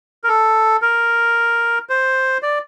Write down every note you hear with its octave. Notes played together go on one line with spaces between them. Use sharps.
A#4
A4
A#4
C5
D5